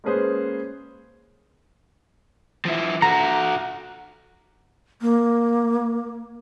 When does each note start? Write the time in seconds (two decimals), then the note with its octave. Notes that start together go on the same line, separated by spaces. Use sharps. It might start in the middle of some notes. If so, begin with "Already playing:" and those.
0.04 G#3 A#3 C#4 G#4 B4 C5
2.65 F3 E4
3.02 F#4 A4 A#5
5.02 A#3